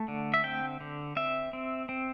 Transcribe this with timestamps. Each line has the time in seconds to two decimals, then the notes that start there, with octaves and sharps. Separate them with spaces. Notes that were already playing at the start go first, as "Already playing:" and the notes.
Already playing: A3
0.08 D3
0.34 E5
0.44 C4 G5
0.81 D3
1.16 C4 E5
1.53 C4
1.89 C4